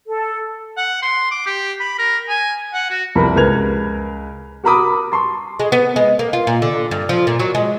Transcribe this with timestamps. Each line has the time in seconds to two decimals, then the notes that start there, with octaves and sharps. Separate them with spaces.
0.07 A4
0.77 F#5
1.02 C6
1.31 D6
1.47 G4
1.80 B5
1.99 A#4
2.29 G#5
2.74 F#5
2.90 F#4
3.15 C2 F2 A#4 B5
3.36 C#2 A#4 B4 G#6 F7
4.64 F#4 A#4 A#5 B5 D6 D#6
5.12 A5 C6 C#6
5.60 G#3
5.72 B3
5.96 G#3
6.19 A#3
6.33 F4
6.47 A#2
6.62 D3
6.91 G2
7.09 F3
7.27 A#2
7.39 F#3
7.55 G#3